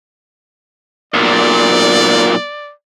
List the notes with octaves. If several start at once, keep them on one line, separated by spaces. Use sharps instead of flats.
B1 A#2 D5